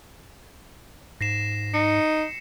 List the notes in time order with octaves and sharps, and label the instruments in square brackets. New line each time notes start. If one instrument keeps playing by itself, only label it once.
[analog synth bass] G#2 [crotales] A#6 C7 E7
[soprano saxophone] D#4 [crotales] C#7